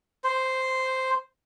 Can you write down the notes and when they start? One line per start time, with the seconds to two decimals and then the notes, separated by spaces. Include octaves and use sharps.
0.24 C5